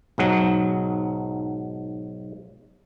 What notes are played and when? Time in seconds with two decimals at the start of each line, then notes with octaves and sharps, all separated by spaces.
0.18 B1 G#2 F#3